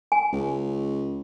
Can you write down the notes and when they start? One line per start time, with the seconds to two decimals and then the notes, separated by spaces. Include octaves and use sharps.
0.12 G#5
0.33 C#2